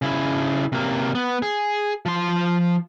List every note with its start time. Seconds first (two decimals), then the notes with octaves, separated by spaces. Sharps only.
0.02 C#3 E4
0.72 C3 A#3
1.15 B3
1.42 G#4
2.06 F3 C6